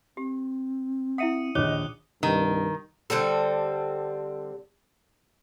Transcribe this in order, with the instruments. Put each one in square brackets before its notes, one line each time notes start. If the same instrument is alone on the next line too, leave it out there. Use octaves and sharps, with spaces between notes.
[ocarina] C4 [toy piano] G4
[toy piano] E4 E5 F#5 [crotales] D#6 C#7 D#7
[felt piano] A#1 D#2 [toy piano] C#5 [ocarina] D#5 [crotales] D6 F#6 G7
[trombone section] C2 G2 [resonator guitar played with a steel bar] D#3
[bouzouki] D3 G3 C4 A4